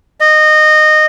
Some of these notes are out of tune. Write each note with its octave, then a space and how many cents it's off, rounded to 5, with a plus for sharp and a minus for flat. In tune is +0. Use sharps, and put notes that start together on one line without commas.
D#5 -20